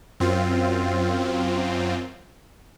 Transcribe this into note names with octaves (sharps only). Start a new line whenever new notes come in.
F#2 C4 F4